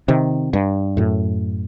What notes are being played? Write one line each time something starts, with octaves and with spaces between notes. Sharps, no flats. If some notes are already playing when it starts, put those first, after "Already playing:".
C3 D#3
G2
F#2 A2